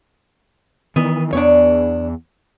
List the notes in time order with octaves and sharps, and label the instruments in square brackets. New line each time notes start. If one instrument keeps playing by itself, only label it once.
[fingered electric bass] D#3 E3 [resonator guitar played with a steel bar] B3
[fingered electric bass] E2 B3 [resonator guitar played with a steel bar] D4 C#5